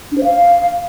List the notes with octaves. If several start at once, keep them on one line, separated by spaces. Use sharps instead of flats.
D4
C5
F5